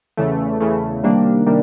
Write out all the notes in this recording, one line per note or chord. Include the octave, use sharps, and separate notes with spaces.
E2 C#3 E3 A3
E2 C#3 E3 A3
C3 D#3 G3 A#3 D4
C3 D#3 G3 A#3 D4